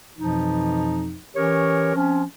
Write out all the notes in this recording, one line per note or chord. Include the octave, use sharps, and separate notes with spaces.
F2 B2 E3 F3 D#4
E3 C#4 G4 A#4 C#5
F3 C4 C#4